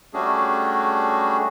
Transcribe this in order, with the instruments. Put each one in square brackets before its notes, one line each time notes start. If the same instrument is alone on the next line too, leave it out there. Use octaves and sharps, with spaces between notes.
[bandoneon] G3 A3 C#4 D4 F#4 G#4